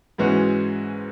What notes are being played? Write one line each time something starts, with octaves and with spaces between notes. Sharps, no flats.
G#2 E3 G#3 C#4 F#4